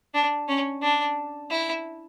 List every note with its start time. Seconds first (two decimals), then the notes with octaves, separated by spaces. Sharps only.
0.14 D4
0.48 C#4
0.83 D4
1.50 E4